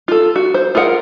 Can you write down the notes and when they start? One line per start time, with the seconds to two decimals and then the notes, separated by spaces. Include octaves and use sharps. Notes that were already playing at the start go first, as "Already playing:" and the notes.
0.08 F4 A4
0.36 F#4
0.54 C5
0.75 F4 G#4 A#4 F#5